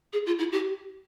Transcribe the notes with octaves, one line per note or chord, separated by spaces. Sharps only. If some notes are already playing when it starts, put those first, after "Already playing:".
G#4
F4
E4
G4